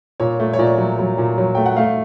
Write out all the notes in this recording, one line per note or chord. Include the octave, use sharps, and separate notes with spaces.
A#2 C#5
A3
C#5
A#2 D5
F#3
F#3
A#2
F#3
A3 G5
F#5
A3 F5